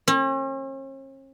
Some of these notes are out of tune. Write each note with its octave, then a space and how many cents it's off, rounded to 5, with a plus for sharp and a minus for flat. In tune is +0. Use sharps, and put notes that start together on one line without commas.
C#4 -45